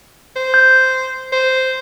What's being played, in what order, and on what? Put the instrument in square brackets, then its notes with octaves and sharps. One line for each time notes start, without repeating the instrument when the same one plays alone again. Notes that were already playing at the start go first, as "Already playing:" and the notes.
[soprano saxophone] C5
[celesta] G6
[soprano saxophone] C5